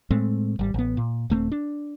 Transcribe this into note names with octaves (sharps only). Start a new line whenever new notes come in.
A2 G#3 A3 C4
G#1 G3
A1 B3
A#2
D#1 A3 A#3 C4
D4